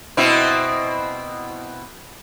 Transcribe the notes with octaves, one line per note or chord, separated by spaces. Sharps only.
B2 C4 E4